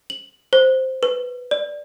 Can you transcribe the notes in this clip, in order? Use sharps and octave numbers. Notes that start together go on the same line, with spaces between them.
F#7
C5
B4
D5